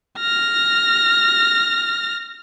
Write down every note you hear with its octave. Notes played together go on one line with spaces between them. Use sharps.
F6 A#6